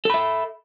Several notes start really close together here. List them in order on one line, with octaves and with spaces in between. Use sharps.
A4 B5 E5